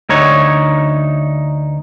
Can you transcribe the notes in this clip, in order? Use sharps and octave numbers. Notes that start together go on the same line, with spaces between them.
D2 D#4 C#5